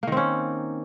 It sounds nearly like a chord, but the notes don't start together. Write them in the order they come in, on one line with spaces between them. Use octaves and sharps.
A#3 D#3 C4 C#4